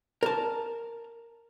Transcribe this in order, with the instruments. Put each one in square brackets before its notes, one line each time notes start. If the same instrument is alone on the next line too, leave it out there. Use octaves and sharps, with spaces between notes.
[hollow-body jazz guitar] A#4 A5